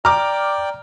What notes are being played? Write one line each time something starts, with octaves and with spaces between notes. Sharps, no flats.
D5 G5 A#5 D6 F6